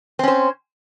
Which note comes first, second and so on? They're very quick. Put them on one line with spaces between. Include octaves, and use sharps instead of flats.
C4 C#4 C5